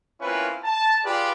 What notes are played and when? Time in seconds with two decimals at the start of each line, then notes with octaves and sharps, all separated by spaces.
0.21 A#3 C4 C#4 E4 F4 B4
0.64 A5
1.03 F4 G4 G#4 B4 D5